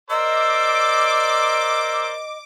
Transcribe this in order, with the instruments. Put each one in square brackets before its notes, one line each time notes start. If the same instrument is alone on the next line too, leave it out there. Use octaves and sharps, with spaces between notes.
[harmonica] A#4 C5 D5 [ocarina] D#5 [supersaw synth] D6 [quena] E6